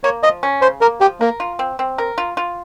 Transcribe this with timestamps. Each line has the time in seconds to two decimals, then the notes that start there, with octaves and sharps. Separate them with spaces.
0.04 A#3 C#5
0.23 F3 D#5
0.43 C#4
0.62 C#3 C5
0.81 A#3 A#4
1.01 F3 G4
1.21 A#3 A#4
1.40 F4
1.59 C4
1.79 C4
1.98 A#4
2.18 F4
2.37 F4